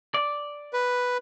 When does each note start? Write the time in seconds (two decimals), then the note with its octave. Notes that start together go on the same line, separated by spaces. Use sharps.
0.14 D5
0.73 B4